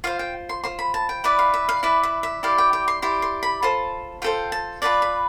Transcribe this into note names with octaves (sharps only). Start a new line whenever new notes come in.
F4 C5 F5
G5
C6
F4 C5 C6
B5
A5
G5
E4 B4 D5
F5
E5
F5
E4 B4 D5 E5
E5
E5
E4 G4 D5 F5
G5
G5
C6
E4 G4 D5 C6
C6
B5
F4 A4 C5 A5
F4 A4 C5 G5
A5
F4 B4 D5 A5
B5